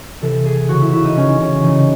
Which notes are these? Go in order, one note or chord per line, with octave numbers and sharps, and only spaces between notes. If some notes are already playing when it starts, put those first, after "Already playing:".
C3 E3 A4
G#4
C#3 E3 F#4
E4
E4
D#4
C#3 E3 C#4
C#4
C#3 E3 D#4